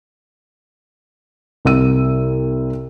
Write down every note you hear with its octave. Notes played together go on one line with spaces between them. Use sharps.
C2 C4 E6 D#7